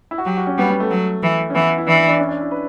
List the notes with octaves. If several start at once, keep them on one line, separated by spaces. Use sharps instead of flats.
E4
F#4
F#3 G4
F#4
C#4
G3 B3
B3
A3
F#3
E3
C#4
E3 B3
E4
E3 D4
E4
D4
C#4
D4
E4
B4